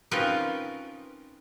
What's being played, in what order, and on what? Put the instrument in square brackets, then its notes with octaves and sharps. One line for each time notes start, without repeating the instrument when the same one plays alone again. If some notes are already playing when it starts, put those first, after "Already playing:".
[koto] C4 C#4 D#4 F4 A#4 B4